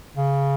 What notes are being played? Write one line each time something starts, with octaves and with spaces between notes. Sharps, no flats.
C#3